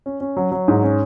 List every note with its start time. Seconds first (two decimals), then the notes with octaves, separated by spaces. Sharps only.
0.06 C#4
0.21 C#4
0.37 F#3
0.51 F#3
0.68 G#2
0.83 C#4